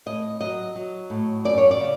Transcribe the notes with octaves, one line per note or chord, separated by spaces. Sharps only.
A2 D#5
F#3 D#5
F#3
A2
F#2 D5
C#5
D5
C#3